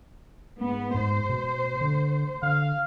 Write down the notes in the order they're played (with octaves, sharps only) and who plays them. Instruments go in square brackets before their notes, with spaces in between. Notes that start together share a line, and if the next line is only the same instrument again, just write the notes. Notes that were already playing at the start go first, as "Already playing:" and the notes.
[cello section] G#2 B3
[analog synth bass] G#2 [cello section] C5
[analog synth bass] B2
D3
[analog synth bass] D3 [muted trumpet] F5